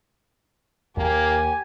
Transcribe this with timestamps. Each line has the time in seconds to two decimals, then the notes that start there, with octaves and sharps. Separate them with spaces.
0.97 D#2 A#3 G4 G#5